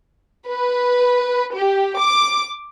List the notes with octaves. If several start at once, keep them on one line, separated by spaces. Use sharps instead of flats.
B4
G4
D6